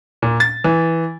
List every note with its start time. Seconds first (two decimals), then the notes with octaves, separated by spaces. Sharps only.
0.22 A#2
0.40 A6
0.64 E3